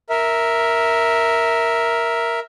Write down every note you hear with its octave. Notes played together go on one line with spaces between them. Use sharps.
A#4 E5